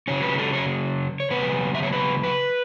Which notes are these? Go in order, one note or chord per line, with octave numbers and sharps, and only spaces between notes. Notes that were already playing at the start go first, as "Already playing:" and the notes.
C#3 F#3 C#4 C#5
B4
A4
C#5
C#5
C#3 F#3 B3 B4
E5
C#5
B4
B4